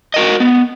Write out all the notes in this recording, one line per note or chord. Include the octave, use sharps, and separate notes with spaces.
F#4 A#4 D#5
B3